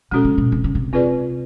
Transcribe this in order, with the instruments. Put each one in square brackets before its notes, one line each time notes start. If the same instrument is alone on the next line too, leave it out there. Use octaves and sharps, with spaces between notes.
[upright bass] B2 [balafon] G#3 C#4 F#4 A4
[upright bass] C3
B2
C3
C#3
C3
[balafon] C4 F4 G#4 B4 D5